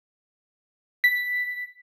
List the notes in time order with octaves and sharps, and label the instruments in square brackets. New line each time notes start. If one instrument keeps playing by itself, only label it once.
[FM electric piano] B6